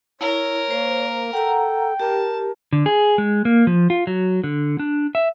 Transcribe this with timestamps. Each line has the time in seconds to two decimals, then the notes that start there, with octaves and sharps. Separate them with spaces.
0.21 E4 A#4 C#5
0.71 A#3 C5
1.33 A4 F#5 G5 A#5
2.00 G4 A#4 A5
2.73 D3
2.86 G#4
3.18 G#3
3.45 A#3
3.67 F3
3.90 F4
4.07 F#3
4.44 D3
4.79 D4
5.15 E5